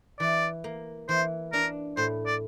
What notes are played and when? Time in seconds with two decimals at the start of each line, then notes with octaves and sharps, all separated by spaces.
0.20 E3 D5
0.64 A#3
1.09 E3 C5
1.53 D4 A#4
1.97 A2 C5
2.27 D5